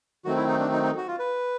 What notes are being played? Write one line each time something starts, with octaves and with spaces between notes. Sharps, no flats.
D#3 F#3 A3 C4 F#4
E4
D#4
D4
D#4
D#4
F#4
F4
B4